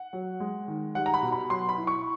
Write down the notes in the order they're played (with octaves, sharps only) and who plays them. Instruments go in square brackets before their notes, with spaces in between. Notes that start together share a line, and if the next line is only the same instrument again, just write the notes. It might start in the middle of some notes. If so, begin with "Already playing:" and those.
Already playing: [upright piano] F#5
F#3
G#3
D#3
G3 F#5
A#5
B5
B2
B5
F#3 C6
B5
E4
C#6